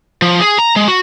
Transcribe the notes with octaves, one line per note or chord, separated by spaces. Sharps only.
F3
G#4
A#5
G#3
F#4